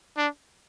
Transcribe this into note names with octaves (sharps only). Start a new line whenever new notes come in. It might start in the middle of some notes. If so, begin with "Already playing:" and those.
D4